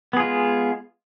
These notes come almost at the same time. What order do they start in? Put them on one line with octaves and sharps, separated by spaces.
B3 G#4 F4 G#3